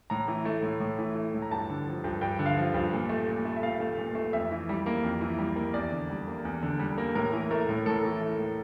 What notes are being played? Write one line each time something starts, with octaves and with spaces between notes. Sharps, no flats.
A2 A#5
E3
A3
A2
A2
E3
A3
A2
A#5
G2 A5
D3
F3
G2
G2 G5
D3
F5
F3
G2
A#2
A3
A#2
A3
E5
A#2 F5
A3
A#2
A3
F2 E5
E3
G3
A#3
F2
E3
G3
A#3
E2 D5
D3
G3
A#3
E2
D3
G3
A#3
A2 A#4
E3
A3 A#4
A2
A2 A4
E3
A3
A2